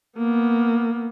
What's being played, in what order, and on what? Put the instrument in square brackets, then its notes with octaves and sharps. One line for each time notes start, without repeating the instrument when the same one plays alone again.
[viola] A#3 B3